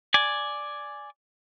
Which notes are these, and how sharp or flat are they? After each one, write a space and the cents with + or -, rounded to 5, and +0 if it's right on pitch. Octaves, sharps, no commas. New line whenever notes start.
D5 +0 G#5 +5